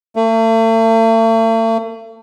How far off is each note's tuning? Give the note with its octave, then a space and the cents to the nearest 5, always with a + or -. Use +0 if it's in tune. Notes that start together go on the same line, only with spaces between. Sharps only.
A3 +40